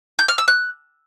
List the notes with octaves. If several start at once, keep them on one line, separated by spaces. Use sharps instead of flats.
G6
F6
E6
F#6